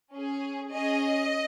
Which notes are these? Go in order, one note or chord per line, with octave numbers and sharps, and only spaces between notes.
C#4 G#4
C#4 G#4 D#5